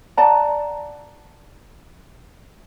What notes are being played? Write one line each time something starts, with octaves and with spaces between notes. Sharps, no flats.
D5 F#5 A5 A#5